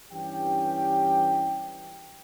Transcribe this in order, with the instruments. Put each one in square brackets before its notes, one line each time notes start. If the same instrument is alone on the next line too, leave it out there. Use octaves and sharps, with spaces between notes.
[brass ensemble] G2 E3 C#4 D4 G4 G5